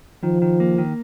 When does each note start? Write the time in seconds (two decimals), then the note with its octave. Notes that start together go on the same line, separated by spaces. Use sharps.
0.23 D#3 F3
0.42 D#3
0.60 A#3
0.78 D#3